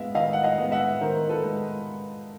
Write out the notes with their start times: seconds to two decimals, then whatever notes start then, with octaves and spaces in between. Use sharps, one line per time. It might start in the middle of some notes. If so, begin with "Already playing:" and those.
Already playing: G#3 B3 E5 F5
0.14 D#3 D#5 F5
0.33 F#5
0.43 D#5 F5
0.58 G#3 B3
0.72 E5 F#5
1.01 D#3 A#4 C5
1.29 A4 B4
1.44 G#3